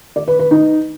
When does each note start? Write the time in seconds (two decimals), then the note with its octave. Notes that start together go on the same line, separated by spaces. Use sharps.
0.16 D5
0.28 B4
0.39 B4
0.51 D#4